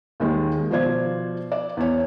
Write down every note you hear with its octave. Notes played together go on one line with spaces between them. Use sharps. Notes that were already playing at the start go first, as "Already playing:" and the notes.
D#2 D#3 G#3
B2 F3 F4 C5 D5 G#6
D5
E2 C#5